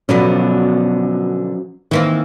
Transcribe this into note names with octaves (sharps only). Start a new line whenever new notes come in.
B2 D3 F3 F#3 B3 C#4
D#3 E3 A#3 C4